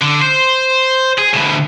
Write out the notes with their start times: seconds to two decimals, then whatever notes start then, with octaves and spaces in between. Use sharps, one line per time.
0.01 D3
0.21 C5
1.18 G#4
1.33 D2 B2